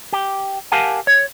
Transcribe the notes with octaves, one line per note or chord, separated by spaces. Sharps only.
G4
G4 A#4 F5 F#5 G#5 A5
C#5